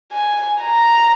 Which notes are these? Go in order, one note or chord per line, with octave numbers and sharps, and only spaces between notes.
G#5
A#5